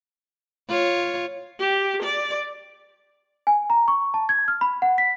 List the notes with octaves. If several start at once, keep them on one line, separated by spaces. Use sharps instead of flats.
F4 C#5
G4
D5
G#5
A#5
C#6
A5
G#6
F6
B5
F#5
B6